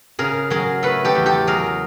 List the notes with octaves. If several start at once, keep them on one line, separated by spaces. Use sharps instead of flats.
C#3 G#4 A#4
F#3 G#4 A#4
A3 A4 B4
G4 A4
E2
G4 A4
F#3 G#4 A#4